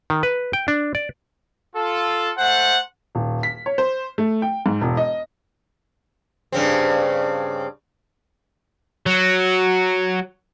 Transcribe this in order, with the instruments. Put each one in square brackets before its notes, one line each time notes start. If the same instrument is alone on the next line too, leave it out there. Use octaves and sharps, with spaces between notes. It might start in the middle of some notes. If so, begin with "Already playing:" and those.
[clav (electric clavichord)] D#3
B4
G5
D4
D5
[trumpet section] F4 A4
A3 C5 F#5
[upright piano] D#1
B6
C#5
C5
A3
G5
G#2
E1
D#5
[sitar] G2 C#3 C4
[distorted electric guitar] F#3